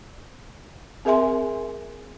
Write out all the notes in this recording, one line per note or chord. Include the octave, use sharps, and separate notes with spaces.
C4 G#4 A#4 E5 G#5 C6